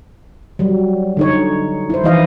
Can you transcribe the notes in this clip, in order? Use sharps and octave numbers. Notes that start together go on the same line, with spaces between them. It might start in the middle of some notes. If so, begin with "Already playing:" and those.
F#3 G3
D3 D#4 C#5
E4 C5
E3 F3 D#4 E4 D#5 F5